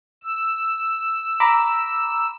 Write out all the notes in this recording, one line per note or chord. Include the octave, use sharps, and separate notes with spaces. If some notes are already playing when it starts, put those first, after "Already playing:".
E6
A#5 B5 D6